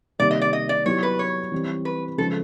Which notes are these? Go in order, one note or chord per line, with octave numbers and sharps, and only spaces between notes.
C3 D#3 G3 A#3 D5
D#5
D5
D#5
D5
F#3 B3 E4 G4 C#5
B4
C#5
E3 G3 C4
B4
C#3 F3 G#3 A4